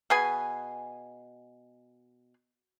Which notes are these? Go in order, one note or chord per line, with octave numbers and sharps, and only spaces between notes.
B2 G#4 B4 G#5